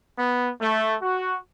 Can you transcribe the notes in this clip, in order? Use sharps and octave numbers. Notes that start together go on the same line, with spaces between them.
B3
A3
F#4